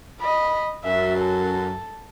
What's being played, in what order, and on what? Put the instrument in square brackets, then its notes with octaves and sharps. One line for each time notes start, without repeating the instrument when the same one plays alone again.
[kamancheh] D#5 B5
[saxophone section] F#2 [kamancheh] E5
[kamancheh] A4